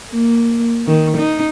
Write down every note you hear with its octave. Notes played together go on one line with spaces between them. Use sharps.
A#3
D#3
D#4